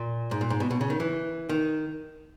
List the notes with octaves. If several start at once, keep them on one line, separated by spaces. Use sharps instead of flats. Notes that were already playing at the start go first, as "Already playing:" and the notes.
Already playing: A#2
G#2
A#2
G#2
B2
B2
C#3
D#3
E3
D#3